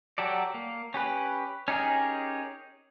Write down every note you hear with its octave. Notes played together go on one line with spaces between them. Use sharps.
F#3 G4 A4 D5
A#3
C#4 G4 B4
C#4 D#4 G4 G#4 A#4